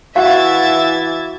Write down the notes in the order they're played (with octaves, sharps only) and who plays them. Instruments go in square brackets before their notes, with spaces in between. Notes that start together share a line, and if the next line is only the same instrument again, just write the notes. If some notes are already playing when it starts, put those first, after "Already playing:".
[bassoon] E3 [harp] F#4 [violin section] E5 G#6 A6 [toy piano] F5